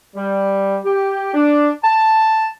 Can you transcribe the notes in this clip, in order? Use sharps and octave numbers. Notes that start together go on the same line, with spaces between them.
G3
G4
D4
A5